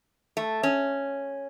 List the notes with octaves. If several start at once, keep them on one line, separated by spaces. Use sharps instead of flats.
A3
C#4